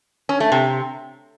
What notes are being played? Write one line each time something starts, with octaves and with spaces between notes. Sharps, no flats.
C#4
A3
C3